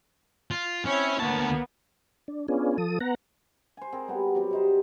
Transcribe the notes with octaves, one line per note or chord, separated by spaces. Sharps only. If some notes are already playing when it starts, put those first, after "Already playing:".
F4
C4 C#4 E4 C#5
D2 A#3 B3 A5
D4
B3 C#4 D4 F4 G#4
F3 A4 D#6
B3 F#5 A#5
C5 G#5
C4 G#4 A#4
G3 B3 F#4
F#3 G3 C4
C3 D#4 C5